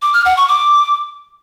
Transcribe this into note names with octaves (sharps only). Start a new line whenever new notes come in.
D6
F6
F#5
C#6
D6